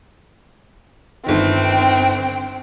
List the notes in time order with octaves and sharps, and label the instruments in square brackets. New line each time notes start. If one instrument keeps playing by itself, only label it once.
[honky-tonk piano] G1 D#3 [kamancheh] C4 G5